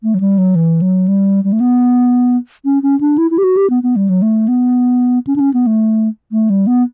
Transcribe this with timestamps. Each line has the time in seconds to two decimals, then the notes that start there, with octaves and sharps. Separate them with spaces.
0.03 A3
0.14 F#3
0.20 G3
0.38 F#3
0.55 E3
0.82 F#3
1.08 G3
1.44 G3
1.53 A3
1.60 B3
2.65 C#4
2.83 C#4
3.00 D4
3.18 E4
3.31 E4
3.38 G4
3.44 F#4
3.57 G4
3.70 B3
3.83 B3
3.96 G3
4.09 F#3
4.22 A3
4.48 B3
5.27 C#4
5.36 D4
5.40 C#4
5.54 B3
5.67 A3
6.32 A3
6.50 G3
6.67 B3